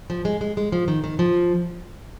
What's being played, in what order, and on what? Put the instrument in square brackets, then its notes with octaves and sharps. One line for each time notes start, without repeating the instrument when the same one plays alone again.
[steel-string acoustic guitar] F3
G#3
G#3
G#3
F3
D#3
D#3
F3